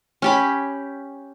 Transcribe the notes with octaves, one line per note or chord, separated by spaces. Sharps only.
C#4 G4 B5